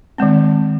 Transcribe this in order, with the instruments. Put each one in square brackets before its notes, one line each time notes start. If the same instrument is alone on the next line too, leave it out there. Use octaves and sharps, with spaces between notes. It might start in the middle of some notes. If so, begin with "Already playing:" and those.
[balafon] D#3 G#3 C4